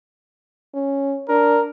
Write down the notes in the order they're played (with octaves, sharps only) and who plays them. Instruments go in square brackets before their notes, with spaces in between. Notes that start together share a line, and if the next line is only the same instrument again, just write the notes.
[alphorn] C#4
[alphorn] D4 [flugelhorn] A#4